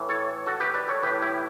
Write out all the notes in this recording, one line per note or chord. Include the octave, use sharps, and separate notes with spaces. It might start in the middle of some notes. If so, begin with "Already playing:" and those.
Already playing: A2 E3
A4 C#5
F#4 A4
G4 B4
B4 D5
A4 C#5
A2 E3 G4 B4
E4 G4